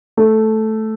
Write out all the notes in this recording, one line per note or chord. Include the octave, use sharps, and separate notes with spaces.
A3